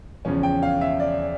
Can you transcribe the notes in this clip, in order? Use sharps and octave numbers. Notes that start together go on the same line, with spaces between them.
E2 C#3 F3 C#4
G5
F5
E5
D5